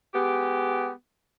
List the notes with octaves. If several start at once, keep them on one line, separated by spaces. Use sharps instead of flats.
G#3 B3 G4